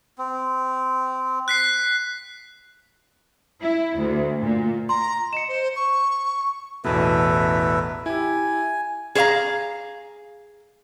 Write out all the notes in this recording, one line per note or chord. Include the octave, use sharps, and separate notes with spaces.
C4
F#6 B6 C7
E4
D2
A#2
A#5 C6
D#5 C#7 E7
C5
C#6
A1 E2 B2 A4 B4 E5
E4 G4 G#5
G#4 C5 C#5 F5 A#5